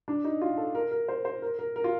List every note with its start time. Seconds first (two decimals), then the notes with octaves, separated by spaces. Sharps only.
0.08 D4
0.24 D#4
0.42 F4
0.58 A4
0.75 A#4
0.91 A#4
1.09 C5
1.25 C5
1.42 A#4
1.59 A#4
1.76 A#4
1.84 F4